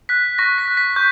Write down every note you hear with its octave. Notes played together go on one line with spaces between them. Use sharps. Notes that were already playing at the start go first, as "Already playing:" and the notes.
F#6 B6
C#6 A#6
B6
F#6
B6
C#6 G6